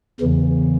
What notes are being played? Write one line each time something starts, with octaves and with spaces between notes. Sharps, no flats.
E2 C#3 E3